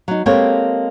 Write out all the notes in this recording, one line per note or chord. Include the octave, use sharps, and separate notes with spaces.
F#3 D#4
G#3 A#3 C4 G4 A4 C#5